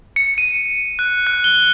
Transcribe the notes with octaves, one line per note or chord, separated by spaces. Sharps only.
C#7
D#7
F#6
F#6
G7